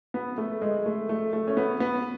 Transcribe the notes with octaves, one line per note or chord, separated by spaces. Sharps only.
B3
A3
G#3
A3
A3
A3
C#4
B3
B3